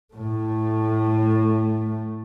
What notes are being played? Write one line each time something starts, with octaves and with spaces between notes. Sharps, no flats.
A2 A3